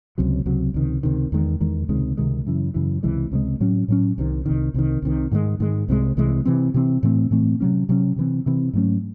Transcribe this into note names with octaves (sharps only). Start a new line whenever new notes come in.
C#2 C3 F#3
C#2 C3 F#3
C#2 C3 D#3
C#2 C3 D#3
E2 D#3 G#3
E2 D#3 G#3
C#2 C3 D#3 G#3
C#2 C3 D#3 G#3
F#2 C#3 E3
F#2 C#3 E3
C#2 C3 E3 G#3
C#2 C3 E3 G#3
A2 F#3 C#4
A2 F#3 C#4
C2 C3 D#3
C2 C3 D#3
C2 C3 D#3
C2 C3 D#3
G#2 D#3 G#3
G#2 D#3 G#3
C2 C3 E3 G#3
C2 C3 E3 G#3
C3 E3 C4
C3 E3 C4
A2 E3 A3 C4
A2 E3 A3 C4
C3 F#3 C#4
C3 F#3 C#4
C3 E3 C4
C3 E3 C4
G#2 F#3 A3 C#4